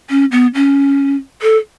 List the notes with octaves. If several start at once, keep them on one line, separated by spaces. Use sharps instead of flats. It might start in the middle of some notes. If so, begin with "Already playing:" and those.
C#4
B3
C#4
A4